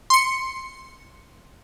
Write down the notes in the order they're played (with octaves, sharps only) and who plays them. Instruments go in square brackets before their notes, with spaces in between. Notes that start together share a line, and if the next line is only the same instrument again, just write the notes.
[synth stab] C6 C#7